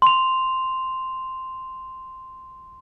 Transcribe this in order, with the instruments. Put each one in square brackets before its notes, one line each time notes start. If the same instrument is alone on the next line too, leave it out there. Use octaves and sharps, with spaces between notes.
[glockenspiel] C6 F7